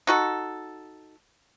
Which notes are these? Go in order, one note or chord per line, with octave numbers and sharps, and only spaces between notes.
D#4 F#4 A4